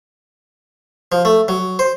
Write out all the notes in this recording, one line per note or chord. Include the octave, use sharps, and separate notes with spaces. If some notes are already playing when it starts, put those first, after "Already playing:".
F3
A3
F#3
C5